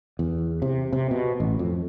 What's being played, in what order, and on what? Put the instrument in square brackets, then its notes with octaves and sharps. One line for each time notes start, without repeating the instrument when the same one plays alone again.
[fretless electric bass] E2
C3
C3
B2
A1
F2